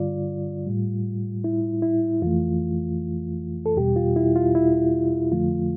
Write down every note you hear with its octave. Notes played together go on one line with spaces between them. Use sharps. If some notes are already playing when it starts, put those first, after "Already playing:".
Already playing: G2 D3 G3 F4 D5
A2 G3
E4
E4
F2 E3 A3 F4
A4
E2 B2 G3 G4
F4
E4
F4
E4
F2 D3 F3 A3 F4